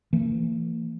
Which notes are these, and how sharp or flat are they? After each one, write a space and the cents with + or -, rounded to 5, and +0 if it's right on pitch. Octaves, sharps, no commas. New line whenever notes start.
E3 +30 A#3 -35